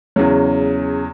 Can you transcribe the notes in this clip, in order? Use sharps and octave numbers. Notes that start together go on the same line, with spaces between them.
E2 C#3 F#3